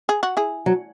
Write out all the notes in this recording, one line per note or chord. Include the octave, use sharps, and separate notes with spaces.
G#4
F#4
E4 G#4
F#3